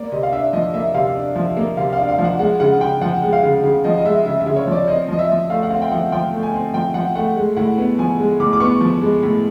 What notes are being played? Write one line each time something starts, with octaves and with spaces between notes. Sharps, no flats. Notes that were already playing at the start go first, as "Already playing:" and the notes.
Already playing: A#3 D5
C3 D#5
F5
D4 E5
F3 D#5
A#3 E5
C3 F5
D4
F3
A#3
C3 F5
F5
D4
F5
F3
F#5
G#3 F#5
C#3 F#5
C#3 G5
F3 F#5
G#3
F5
C#3
C#3
F3 D#5
D#5
G#3 E5
C#3 E5
E5
C#3
C#5
F3 D5
C4 D#5
F3 D#5
E5
F3
A3 F5
F#5
C4 F5
G5
F3 F#5
F3 G5
A3
G#5
C4
F3 G5
F3 F#5
A3 F#5
G#3
A2 F#5
B3
F3 G#5
G#3
A2 D6
D6
B3 C#6
F3
G#3
A2